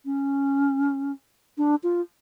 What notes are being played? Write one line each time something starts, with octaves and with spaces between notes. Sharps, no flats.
C#4
D4
F4